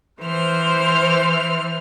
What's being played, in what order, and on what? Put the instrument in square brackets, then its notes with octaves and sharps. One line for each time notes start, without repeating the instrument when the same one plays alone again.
[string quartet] E3 F6 [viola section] C5